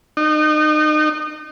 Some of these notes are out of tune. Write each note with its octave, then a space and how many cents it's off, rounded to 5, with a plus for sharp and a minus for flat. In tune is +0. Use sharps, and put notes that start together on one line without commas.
D#4 -30